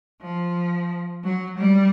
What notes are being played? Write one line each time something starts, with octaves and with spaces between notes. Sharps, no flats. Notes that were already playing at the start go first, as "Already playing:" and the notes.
F3
F#3
G3